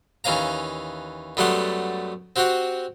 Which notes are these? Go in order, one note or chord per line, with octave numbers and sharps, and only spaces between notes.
D#2 E3 C#4 F5 A#5
F#2 G3 A3 B3 F#5 C6
C4 F#4 G4 C5 F#5